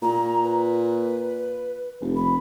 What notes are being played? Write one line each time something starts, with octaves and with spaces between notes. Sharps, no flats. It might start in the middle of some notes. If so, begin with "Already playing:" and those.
A#2 A#5
B4
F1
B5